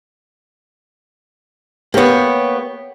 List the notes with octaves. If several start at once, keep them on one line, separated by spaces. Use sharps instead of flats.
A#3 B3 G4 C#5